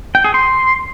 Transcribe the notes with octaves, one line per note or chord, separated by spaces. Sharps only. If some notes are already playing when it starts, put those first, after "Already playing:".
G5
G#4
C6